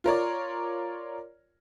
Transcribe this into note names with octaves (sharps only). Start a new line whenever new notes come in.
F4 A#4 C#5 D5